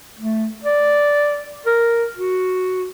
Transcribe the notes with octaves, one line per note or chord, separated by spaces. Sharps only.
A3
D5
A#4
F#4